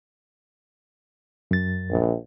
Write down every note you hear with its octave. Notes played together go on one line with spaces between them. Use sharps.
F#2 A6
A#1